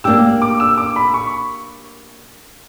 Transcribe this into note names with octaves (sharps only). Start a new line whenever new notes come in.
A#3 D4 G4 E6
D6
E6
D6
B5
C#6